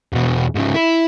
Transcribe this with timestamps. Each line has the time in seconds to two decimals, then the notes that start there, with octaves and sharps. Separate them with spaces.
0.13 E2 B2
0.55 G#2 C#3
0.74 E4